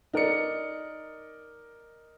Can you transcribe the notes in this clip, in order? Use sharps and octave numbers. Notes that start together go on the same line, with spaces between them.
D#4 A#4 D5 C#7